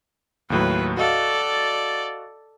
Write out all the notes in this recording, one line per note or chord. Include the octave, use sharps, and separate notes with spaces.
D#2 A2 F#3 B4
F#4 A4 D5 D#5 F5